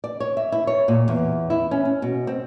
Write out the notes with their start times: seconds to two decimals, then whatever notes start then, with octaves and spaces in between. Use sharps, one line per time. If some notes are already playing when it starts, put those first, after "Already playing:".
0.04 D5
0.20 C#5
0.37 E5
0.52 E4
0.67 C#5
0.88 A#2
1.08 E2
1.50 E4
1.71 C#4
1.85 C#4
2.02 B2
2.27 C4